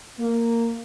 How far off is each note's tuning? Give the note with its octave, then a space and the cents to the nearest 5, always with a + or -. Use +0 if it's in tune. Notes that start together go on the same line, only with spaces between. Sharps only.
A#3 -10